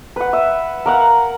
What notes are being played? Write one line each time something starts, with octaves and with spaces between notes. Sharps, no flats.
B4 F#5
E5
A#4 F5 F#5